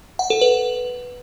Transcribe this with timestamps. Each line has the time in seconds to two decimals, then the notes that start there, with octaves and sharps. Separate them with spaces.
0.19 F#5
0.30 A4
0.41 B4